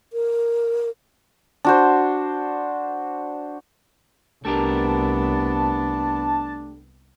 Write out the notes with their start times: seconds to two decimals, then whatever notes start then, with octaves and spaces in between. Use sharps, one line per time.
0.13 A#4
1.65 D4 F#4 C5
4.45 C2 A3 B3 D4 G4 A#4 A5